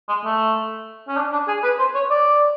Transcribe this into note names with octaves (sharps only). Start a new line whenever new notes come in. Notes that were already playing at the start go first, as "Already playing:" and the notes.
G#3
A3
C#4
D4
D4
G#4
B4
C5
C#5
D5